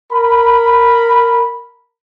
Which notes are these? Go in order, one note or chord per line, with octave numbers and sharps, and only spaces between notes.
A#4 B5